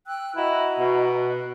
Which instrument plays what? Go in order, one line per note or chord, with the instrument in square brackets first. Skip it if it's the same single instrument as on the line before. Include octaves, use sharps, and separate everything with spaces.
[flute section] G5 E6 F#6
[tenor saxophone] E4 [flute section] F#4 D#5 A#5
[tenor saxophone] B2
[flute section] F#6